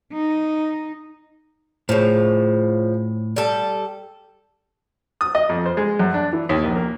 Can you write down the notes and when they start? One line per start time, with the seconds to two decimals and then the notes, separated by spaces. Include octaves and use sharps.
0.13 D#4
1.89 A2 C#3 F3
3.36 G3 A4
5.21 D#6
5.35 D#5
5.49 F2
5.66 C5
5.77 G#3
5.99 F#2
6.14 D4
6.33 E3
6.49 D#2
6.64 A#1
6.76 A#3